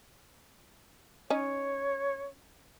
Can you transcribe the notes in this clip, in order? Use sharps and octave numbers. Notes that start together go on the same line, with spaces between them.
C#4 D#4 C#5